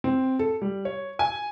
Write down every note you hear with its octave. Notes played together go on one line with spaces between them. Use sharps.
C4
A4
G3
C#5
G#5